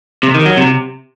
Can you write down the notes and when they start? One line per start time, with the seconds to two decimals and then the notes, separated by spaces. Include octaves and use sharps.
0.23 C3
0.34 D#3
0.46 F#3
0.57 C3